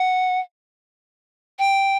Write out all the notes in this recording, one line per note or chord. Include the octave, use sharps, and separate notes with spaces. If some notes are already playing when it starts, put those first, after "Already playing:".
Already playing: F#5
G5